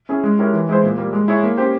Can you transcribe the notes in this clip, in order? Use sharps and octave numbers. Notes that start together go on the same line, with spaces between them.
C#4 E4 G#4
G#3
E4 G4 A#4 C#5
E3
G#3 E4 G#4 C5
A#2
G3 A#3
G#3
E4 G#4 C#5
A#3
C#4 G4 C5